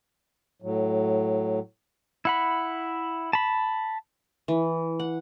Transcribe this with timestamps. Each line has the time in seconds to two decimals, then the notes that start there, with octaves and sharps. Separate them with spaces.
0.62 A2 F#3
2.25 E4 F#5 B5
3.33 A5 B5
4.48 E3
4.99 F#5